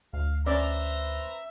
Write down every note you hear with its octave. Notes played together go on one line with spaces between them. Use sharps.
D2 F5
C#4 B4 C5 D5 E5 A#5